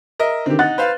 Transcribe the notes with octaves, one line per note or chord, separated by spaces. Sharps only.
A#4 D#5 E5
D3 D#3 C4 G4
D#4 F#5 F#6 A6
B4 C5 F5